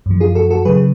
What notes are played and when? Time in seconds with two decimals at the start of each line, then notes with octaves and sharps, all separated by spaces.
0.06 F#2 F3
0.20 F4 G#4
0.35 F#4 A4
0.50 F#4 A4
0.65 C#3 F#3 G#4 B4